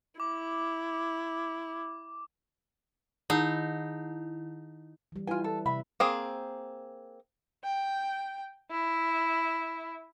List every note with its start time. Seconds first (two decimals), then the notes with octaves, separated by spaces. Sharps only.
0.20 E4 D6
3.30 D#3 D#4 E4
5.12 E3 G3
5.27 E4 F4 B4 G#5
5.44 A4
5.66 C3 E5 B5
6.00 A#3 C4 G#4
7.64 G5
8.71 E4